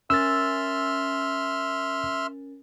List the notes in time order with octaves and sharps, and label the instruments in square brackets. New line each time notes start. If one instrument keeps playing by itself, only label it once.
[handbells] C#4 A#4 A6 [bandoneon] E5 C6 F6 [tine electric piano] E6